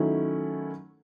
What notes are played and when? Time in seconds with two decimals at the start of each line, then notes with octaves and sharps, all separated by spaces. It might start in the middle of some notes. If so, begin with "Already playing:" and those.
Already playing: D#3 F#3 A3 C#4 E4